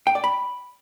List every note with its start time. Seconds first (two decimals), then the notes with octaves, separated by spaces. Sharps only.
0.07 G5
0.15 D5
0.24 B5